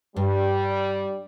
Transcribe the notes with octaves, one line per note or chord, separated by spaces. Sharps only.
G2 G3